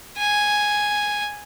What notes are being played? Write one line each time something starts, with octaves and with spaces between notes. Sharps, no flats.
G#5